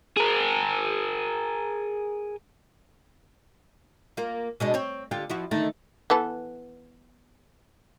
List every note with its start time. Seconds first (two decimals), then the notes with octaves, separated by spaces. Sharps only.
0.17 G#4 A#4
4.17 A#3 F4
4.60 B2 G#3 D4
4.74 C4 C#5
5.11 D3 F4 G4
5.30 F3 E4 F#4
5.51 D3 D#3 A3
6.10 E3 B3 A4